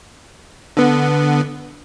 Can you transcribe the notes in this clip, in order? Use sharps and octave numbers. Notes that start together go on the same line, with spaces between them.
D3 B3